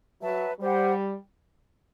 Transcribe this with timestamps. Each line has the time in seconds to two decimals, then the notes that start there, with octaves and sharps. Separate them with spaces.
0.21 F#3 B4 E5 A5
0.60 G3 G4 C5 F#5